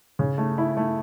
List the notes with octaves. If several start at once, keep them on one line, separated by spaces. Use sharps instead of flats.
C#3
A3
E4
A3